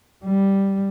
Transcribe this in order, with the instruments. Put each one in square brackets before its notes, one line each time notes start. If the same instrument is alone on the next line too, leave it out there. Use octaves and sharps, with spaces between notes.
[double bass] G3